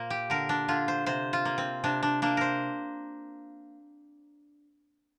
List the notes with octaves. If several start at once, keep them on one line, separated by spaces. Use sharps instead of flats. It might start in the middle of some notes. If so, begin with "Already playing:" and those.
Already playing: A#2 A#3 A#4 C5
G4
D3 A#4
D4
D3 F4
C5
C3 C5
F4
A#3
C4
C3 D4
D4
A#3 D4
A#4 C5